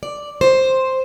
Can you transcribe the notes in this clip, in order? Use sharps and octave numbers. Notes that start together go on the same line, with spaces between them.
D5
C5